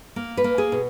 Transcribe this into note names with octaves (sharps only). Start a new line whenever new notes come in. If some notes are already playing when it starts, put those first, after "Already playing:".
A#3
B4
A#3
G#4
B2